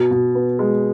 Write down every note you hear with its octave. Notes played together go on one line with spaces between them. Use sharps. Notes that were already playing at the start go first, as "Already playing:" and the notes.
Already playing: B2
B2
B3
G#3